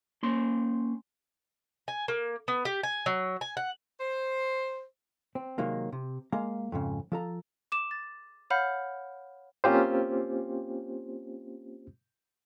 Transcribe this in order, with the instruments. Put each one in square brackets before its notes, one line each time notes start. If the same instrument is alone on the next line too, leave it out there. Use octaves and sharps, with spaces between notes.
[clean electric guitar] A#3 C#4 C6
[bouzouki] G#5
A#3
B3
G4
G#5
F#3
G#5
F#5
[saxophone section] C5
[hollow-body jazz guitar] C4
C3 D#3 F#3 G#3 A#3
C3
G#3 A#3 F5 A#5
F2 G#2 C#3
F3 A4 A#5
[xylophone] D6 E7
A6
C#5 F5 F#5 B5 F6 G6
[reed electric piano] A#3 C4 C#4 F4 G4 C5